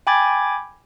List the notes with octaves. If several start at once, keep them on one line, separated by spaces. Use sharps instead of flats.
G5 G#5 B5 D6 G#6 A6